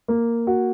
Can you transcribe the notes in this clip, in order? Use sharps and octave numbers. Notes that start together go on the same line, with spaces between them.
A#3
F#4